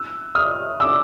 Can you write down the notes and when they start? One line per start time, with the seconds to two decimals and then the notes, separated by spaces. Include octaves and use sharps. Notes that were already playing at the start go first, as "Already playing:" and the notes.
Already playing: E6 F#6
0.35 D#6 F6
0.80 D6 E6